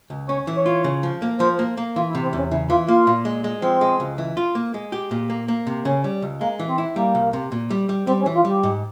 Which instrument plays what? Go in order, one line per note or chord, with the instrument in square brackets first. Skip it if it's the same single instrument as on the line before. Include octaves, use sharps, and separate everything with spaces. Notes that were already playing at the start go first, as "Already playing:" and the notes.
[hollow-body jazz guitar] C#2
[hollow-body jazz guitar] C#4 [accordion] C#5
[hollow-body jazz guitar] E3
[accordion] C#5
[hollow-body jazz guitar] F4
C#3
F3
A#3
[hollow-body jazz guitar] F3 [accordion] C5
[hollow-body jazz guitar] A#3
A#3
[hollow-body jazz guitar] E3 [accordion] F4
[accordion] E4
[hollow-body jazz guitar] C3
[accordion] C4
[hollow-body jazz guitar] E2
[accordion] C#4
[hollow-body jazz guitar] C#3 [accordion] E4
[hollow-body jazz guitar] E3 [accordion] F4
[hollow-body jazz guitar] A#3 [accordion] F4
[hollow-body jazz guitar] A#2
G#3
G#3
[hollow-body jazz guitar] F3 [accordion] C4
[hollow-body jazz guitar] G#3
C#2
E3
F4
A#3
G#3
G4
A#2
A#3
A#3
C3
[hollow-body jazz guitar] C#3 [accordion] C#4
[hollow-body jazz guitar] G3
C#2
[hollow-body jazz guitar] G#3 [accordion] A#3
[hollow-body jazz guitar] E3
[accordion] C4
[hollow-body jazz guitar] E4
[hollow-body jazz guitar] G3 [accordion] A#3
[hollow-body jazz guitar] C2
C3
A#2
G3
G3
[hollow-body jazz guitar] G3 [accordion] C4
[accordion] C#4
[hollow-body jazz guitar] E3
[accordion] F4
[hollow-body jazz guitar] G3 [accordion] G4
[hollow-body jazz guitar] G#2